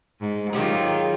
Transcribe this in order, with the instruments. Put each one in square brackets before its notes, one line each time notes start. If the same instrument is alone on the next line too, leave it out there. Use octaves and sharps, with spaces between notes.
[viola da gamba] G#2
[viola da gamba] D#3 F4 [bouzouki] F#3 G4 G#4